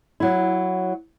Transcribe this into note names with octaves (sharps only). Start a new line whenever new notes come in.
F#3 E4